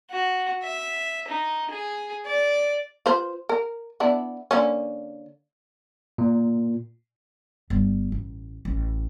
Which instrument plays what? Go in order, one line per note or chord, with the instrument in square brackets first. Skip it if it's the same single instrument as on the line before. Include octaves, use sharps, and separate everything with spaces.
[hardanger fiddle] F#4
E5
D#4
G#4
D5
[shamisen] F4 B4 C5
A#4
B3 D4 E4
D3 A#3 C#4
[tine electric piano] A#2
[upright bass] G1 G3
A1
A1